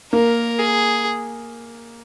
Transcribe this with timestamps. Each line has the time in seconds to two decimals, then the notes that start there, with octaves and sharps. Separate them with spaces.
0.13 A#3 A#4
0.59 G#4